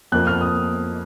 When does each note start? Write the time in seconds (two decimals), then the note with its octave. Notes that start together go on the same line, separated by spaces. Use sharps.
0.12 F2 F3 A#3 F#6
0.27 F6
0.41 D#6